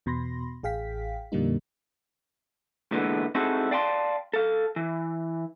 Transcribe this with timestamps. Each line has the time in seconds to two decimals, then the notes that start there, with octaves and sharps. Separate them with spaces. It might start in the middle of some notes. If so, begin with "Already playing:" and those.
0.06 E2 B2 B5 C6 A#6
0.63 A1 G#4 F5 G5 B6
1.32 F2 A#2 D3 G3 A#3 D#4
2.92 A#2 D3 E3 G#3 B3
3.35 C4 D#4 E4 F#4 G#4 A4
3.71 D5 F5 G5 A5 B5 C6
4.33 A4 F5
4.76 E3